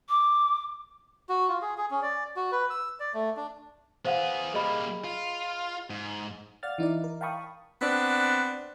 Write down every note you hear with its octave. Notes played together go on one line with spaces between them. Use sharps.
D6
F#4
F4
G#4
G#4
C#4
D5
F#4
B4
E6
D5
A3
D4
B3 G#4 C5 F5 F#5
G3 A#3 G#4 D#5 B5
F4
G#2
D5 F5 F#5 F6 A6
E3 D#4 E4 D5
A#4
F5 G5 A5 B5 C#6 D#6
B3 C4 D4